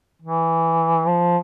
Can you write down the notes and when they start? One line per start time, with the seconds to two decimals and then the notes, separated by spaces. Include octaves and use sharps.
0.22 E3
1.08 F3